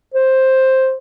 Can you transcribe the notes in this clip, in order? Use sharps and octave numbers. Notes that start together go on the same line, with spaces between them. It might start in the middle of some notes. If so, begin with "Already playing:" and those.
C5